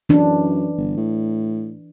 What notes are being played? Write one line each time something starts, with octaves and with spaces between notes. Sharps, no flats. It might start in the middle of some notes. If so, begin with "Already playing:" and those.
F#2 E3 D4
G1
A2